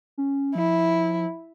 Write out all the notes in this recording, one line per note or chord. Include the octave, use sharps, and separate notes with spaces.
C#4
F3 E4